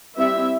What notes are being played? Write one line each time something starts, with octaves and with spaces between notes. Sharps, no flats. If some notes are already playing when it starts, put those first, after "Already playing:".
G3 C4 E4 E5